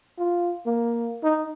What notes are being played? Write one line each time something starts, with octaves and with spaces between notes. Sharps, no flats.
F4
A#3
D#4